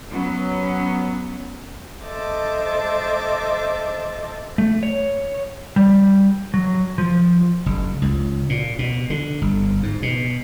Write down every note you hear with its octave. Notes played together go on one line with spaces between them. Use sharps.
F#3 B3 C#4
A4 C5 D#5 E5 A5 D6
A3
C#5
G3
F#3
F3
F#1
C#2
A#2
B2
D3
G1
G#2
B2